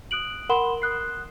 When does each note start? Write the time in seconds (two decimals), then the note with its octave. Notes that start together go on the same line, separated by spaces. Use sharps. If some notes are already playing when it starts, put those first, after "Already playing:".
0.11 D#6 F#6 D7 F#7
0.49 A#4 F#5 B5 C6 E7 G7
0.82 D#6 F#6 C7